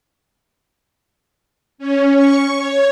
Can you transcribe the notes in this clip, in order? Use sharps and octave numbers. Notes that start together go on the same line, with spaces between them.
C#4
C#6
C#5